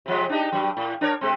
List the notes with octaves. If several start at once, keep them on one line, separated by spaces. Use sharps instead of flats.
C3 F3 G#3
D4 D#4 G4
G2 F#3
A2
D4 A#4 C#5
C3 G#3 C4